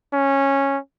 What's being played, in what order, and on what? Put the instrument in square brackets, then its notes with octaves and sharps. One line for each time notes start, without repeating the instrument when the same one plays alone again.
[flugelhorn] C#4